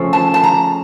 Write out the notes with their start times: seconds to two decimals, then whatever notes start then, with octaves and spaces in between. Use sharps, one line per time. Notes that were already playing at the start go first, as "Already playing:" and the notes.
Already playing: C#3 F3 A3 C#4
0.13 A5
0.34 A5
0.44 A#5